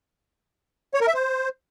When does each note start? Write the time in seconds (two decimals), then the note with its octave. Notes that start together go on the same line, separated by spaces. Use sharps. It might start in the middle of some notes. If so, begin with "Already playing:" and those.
0.94 C#5
1.01 A#4
1.07 E5
1.14 C5